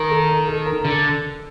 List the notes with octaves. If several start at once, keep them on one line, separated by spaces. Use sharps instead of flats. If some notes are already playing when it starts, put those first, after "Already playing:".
Already playing: D#3 A#4
A4
A#4
A4
A#4
D3 A4